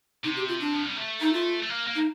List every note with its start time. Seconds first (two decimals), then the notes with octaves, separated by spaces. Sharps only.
0.24 C3 D#4
0.36 G4
0.48 F4
0.60 D4
0.74 F3
0.85 G3
0.97 A3
1.21 D#4
1.33 F4
1.63 A3
1.69 A#3
1.87 A#3
1.95 D#4